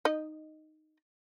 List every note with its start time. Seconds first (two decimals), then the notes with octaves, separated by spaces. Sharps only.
0.05 D#4 D#5